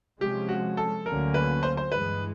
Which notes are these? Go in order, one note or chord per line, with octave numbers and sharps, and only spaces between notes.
C3 F3 G#3 C#4 G4
F#4
A4
D2 D3 F#3 A#3 C#4 A#4
B4
C5
C5
G2 E3 G#3 B4